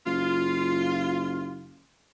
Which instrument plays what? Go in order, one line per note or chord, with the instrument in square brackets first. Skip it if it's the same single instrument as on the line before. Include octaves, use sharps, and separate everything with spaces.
[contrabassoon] F#1 [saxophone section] F4